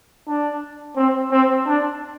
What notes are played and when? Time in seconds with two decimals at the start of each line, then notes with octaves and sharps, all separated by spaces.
0.28 D4
0.96 C4
1.32 C4
1.67 D4